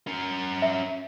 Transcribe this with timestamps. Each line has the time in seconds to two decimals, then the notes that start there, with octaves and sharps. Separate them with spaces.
0.07 C#4 A#4
0.62 E5